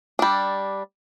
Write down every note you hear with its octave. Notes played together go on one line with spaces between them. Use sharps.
G3 D4